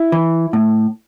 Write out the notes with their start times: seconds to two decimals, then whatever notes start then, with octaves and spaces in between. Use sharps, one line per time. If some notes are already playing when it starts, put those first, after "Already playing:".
Already playing: E4
0.12 E3
0.53 A2